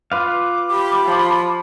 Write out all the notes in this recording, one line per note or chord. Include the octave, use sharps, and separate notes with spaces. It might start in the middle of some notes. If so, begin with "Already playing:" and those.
F4 B4 F5 D6
G4 B5
F3